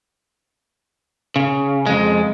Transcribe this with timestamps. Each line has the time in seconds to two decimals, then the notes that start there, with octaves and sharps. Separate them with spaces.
1.36 C#3
1.86 F2 G#3